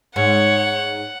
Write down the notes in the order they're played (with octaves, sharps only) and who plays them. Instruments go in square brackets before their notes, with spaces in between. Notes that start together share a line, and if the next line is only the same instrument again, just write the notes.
[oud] G#2 [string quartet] C#5 [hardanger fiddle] F#5